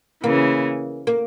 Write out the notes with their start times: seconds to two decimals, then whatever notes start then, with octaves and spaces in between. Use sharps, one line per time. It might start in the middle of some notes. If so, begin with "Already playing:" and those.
0.23 C#3 E3 A#3
1.07 A#3